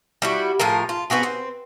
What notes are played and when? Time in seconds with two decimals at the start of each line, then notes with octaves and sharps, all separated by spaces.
0.22 G3 E4 F#4
0.59 A2 F3 G#4 A#4
0.89 F4
1.10 B3 C4 F#4 G#4
1.23 C4